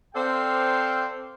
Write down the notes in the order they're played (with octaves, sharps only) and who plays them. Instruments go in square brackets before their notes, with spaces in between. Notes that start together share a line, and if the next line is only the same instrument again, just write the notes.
[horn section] C4 A4 C5 D5 F5 G5